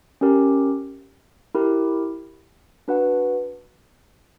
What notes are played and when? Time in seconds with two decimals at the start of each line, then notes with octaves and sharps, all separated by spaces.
0.21 C#4 G4 A#4
1.55 E4 G4 A#4
2.88 D4 F#4 B4 F#5